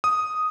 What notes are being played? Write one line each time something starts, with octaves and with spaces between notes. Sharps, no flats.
D#6